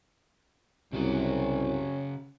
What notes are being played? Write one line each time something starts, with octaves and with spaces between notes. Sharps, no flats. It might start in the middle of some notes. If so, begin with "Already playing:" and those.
C2 C#3 C#4 F#4 G#4